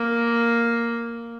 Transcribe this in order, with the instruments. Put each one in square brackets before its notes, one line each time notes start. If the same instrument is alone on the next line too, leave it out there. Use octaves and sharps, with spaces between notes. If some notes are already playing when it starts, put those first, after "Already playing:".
Already playing: [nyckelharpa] A#3